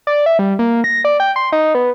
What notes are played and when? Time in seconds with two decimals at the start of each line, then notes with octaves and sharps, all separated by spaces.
0.07 D5
0.26 E5
0.39 G3
0.59 A#3
0.84 A#6
1.05 D5
1.20 G5
1.36 C6
1.52 D#4
1.75 B3